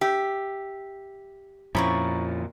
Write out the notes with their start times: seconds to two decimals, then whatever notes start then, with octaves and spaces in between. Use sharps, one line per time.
0.01 G4 E5
1.75 F2 A#2 F3 C#4 E4 A#5 B5 C#6